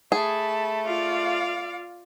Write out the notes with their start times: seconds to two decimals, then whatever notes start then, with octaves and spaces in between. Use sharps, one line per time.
0.12 A3 G#4 A5 B5
0.86 F4 D5 F5